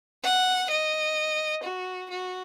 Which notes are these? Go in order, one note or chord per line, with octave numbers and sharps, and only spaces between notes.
F#5
D#5
F#4
F#4